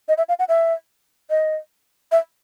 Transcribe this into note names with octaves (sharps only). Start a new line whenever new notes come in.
D#5
E5
F5
F#5
E5
D#5
E5